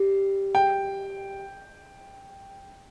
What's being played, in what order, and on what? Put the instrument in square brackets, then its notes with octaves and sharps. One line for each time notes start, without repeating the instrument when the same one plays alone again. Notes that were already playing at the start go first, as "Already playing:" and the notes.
Already playing: [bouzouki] G3 C4 G4
[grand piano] G5